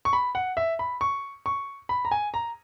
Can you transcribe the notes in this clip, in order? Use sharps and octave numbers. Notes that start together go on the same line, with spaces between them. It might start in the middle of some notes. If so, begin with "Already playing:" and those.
C#6
B5
F#5
E5
B5
C#6
C#6
B5
A#5
G#5
A#5